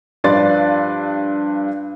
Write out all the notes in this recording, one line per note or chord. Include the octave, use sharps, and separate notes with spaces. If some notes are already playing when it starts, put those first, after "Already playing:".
G2 F3 B4 D5 C6 A6